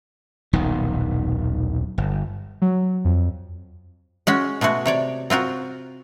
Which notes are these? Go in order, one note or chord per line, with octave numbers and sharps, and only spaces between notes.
D#1 B1 D#3
G1
F#3
F2
G#3 C#4 F#4
B2 G#3 A3 F#4
C3 C#5 D5
C4 F4 F#4 A#4